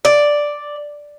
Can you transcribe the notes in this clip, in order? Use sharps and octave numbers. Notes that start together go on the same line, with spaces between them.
D5